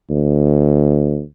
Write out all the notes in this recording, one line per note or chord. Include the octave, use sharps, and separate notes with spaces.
D2